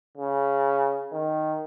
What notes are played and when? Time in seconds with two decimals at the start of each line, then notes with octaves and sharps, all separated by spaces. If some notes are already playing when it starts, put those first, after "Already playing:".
0.17 C#3
1.12 D#3